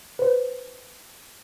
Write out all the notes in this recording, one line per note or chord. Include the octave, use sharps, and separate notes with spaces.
B4 C5